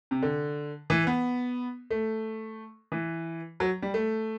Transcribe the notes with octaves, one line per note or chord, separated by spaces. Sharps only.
C3
D3
E3
B3
A3
E3
F#3
G3
A3